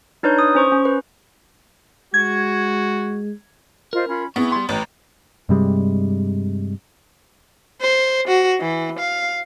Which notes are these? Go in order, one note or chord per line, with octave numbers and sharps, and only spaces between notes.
D4 D#4 B4 C#5 G6
D#6
C#4 C5 C#6
C#4
B4
G#3 F#4 G#6
F4 A#4 C5 D#5
C#4 F4 B5
B3 C4 E4 G#4 C#6
G3 C6
A1 B4 G5 A#5
G2 C3 G3 G#3
C5
F#4
E3
F5